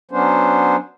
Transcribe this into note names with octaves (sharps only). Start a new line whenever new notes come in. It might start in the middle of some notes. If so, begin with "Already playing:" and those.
F#3 B3 C#4 D4 C5